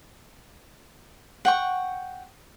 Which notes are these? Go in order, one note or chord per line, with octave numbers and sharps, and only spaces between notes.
F#5 G5 C#6